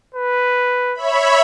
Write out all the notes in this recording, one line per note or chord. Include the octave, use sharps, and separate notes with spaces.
B4
C#5 E5 B5